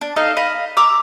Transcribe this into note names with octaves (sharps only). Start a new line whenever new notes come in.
D4
D#4 A4 D#5 F5
D#5 F5 B5
A#5 D6 E6